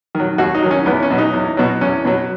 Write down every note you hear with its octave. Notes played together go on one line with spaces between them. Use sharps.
D#3
F#3
D#2 F#4
D#4
D#3 F#3
C#4
E2 B3
C#4
B2 F#3
D#4
E2
B2 F#3
E2 C#4
B2 F#3